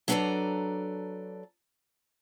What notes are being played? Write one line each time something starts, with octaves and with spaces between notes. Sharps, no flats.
F#3 D4 A4 B4 D5 A#5